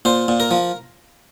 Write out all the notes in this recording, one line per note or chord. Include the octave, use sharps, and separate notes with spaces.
A#2 C5
A#2
A#4
F3